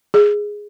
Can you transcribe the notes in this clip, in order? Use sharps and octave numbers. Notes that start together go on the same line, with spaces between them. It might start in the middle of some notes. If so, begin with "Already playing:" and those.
G#4